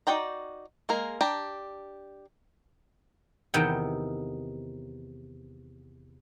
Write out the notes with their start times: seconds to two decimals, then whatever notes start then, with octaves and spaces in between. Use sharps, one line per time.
0.07 D#4 F#4 D5 G5 A#5
0.89 G#3 A#3 A#4
1.21 D4 G4 A#5
3.54 E2 C3 D#3 B3 D#4 G5